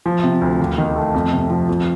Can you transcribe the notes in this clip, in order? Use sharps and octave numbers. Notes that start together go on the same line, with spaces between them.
F3
C3
D2
D#2
D#3
A3
F2
C3
F3
F2